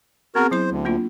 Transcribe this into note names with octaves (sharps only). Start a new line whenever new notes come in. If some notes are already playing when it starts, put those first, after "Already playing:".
B3 C4 F#4 G#4 A#4
F#3 E4 C5 C6
D2
A#3 D4 F4